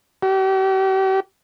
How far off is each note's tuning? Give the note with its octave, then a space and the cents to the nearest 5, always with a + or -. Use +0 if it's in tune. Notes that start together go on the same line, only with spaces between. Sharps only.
G4 -40